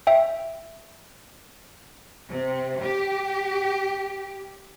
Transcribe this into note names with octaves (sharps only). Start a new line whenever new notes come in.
E5 G5
C3
G4